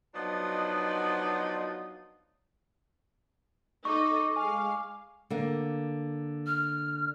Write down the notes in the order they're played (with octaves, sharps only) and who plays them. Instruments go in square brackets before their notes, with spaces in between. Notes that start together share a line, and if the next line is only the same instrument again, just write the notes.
[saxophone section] F3 F#3 B3 D4 D#4 D#5
[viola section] D#4 A4 D#5 [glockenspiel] C#6 D6
[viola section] G#3 F5 [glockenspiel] G#5
[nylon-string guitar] D3 A#3
[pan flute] F6